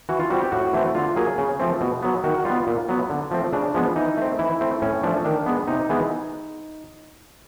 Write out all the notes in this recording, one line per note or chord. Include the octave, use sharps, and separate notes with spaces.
E3 F#4
F4
G3 C4 F#4
G4
A2 F#4
E3 A3 C4
D3 F4
F#3 A#3 G#4
C#3
F3 A3 C4
B2
F#3 B3
D#3 F#4
G3 B3 F4
A#2
F#3 B3
D3
F3 A3 C4
C#3 D4
F3 G#3 B3
E3 D#4
A3 C4
E3 E4
A3 C4
A2 C#4
F3 A3 D4
D#3 D4
G#3 B3
C3 D#4
E3 G#3 B3